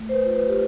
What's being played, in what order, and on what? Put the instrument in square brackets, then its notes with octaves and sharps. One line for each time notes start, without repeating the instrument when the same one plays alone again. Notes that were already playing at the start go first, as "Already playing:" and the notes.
Already playing: [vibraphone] A3
C5
B4
F4
B4
G4